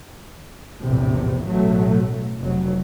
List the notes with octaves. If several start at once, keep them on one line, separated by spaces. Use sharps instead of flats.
A#1 E2 A2 C3
A1 B2 F#3 A3
F1 F#3